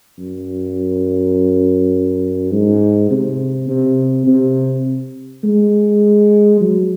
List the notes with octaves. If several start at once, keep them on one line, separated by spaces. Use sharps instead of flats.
F#2
G#2
C3
C3
C3
G#3
F#3